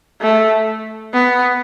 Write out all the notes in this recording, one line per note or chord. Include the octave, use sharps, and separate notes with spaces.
A3
B3